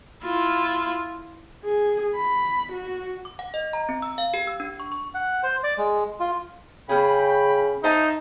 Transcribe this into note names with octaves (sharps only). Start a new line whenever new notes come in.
E4 F4
G#4
B5
F#4
D6
F#5
D#5
A#5
C4
E6
F5
G4
E6
D4
C#6
C#6
F#5
C5
D5
G#3
F4
C#3 C#4 G#4 G5 B5
D#4 C5 E5 A5